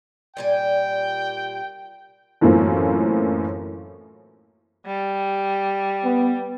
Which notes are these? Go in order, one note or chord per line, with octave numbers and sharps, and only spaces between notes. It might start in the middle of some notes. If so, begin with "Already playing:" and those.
A#2 G3 G5 G#5
F#2 A2 E3 A#3 C4 F4
G3
B3